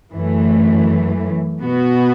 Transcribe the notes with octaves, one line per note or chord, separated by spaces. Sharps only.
F#2 E3 A3
B2 B3 F#4